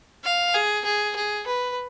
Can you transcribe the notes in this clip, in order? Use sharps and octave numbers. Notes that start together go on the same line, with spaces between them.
F5
G#4
G#4
G#4
B4